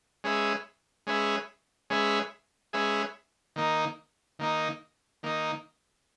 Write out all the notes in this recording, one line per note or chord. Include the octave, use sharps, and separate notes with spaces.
G#3 C#4 G#4 B4 E5
G#3 C#4 G#4 B4 E5
G#3 C#4 G#4 B4 E5
G#3 C#4 G#4 B4 E5
D#3 A#3 D#4
D#3 A#3 D#4
D#3 A#3 D#4